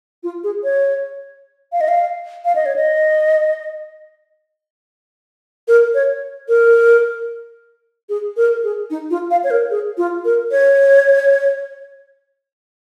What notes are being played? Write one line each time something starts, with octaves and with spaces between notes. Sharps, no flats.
F4
G#4
C#5
F5
D#5
F5
F5
D#5
C#5
D#5
A#4
C#5
A#4
G#4
A#4
G#4
D#4
F4
F5
C#5
A#4
G#4
F4
A#4
C#5